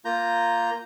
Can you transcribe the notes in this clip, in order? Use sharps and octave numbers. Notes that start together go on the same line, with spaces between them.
A#3 F4 A#5 G6